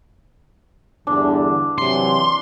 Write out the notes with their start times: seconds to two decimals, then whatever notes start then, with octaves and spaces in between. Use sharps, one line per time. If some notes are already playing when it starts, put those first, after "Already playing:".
1.07 E2 G2 D3 D4
1.78 C3 E3 F#3 C6